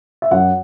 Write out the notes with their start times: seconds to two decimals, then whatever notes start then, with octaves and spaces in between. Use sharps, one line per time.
0.22 E5
0.31 F#2 F#5